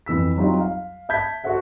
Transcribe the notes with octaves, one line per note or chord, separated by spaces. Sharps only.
F2 E3 E6 B6
F#3 G3 C4 D#4 F4
F5
E5 A5 G6 G#6 B6
F#4 A4 C5 E5 F#5